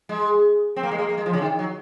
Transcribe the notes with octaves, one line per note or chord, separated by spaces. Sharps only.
G#3
C4
A#3
G#3
A#3
A#3
G#3
F3
C#3
D#3
F#3